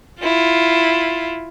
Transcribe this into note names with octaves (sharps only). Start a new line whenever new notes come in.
E4 F4